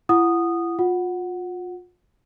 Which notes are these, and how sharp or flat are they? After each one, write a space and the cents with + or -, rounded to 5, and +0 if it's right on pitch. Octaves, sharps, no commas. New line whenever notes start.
E4 +40 F#5 -10 D#6 -10
F4 +35 F#5 +0